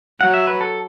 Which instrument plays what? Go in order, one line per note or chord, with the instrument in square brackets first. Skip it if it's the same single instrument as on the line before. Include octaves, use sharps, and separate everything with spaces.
[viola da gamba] F#3 [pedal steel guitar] F#5
[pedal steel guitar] E5
B4
A4